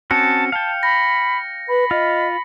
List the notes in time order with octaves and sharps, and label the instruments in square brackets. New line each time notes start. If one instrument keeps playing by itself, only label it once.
[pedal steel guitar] C4 C#4 F#4 [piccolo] A5 [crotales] C#7
[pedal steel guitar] F5 G5 [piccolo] A5
[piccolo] B5 [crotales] A#6
[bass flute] B4 [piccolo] B5
[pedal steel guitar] F4 [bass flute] D#5